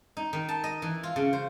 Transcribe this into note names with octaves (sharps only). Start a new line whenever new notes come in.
D#4
D#3
A5
D#5
E3
F4
C#3
C5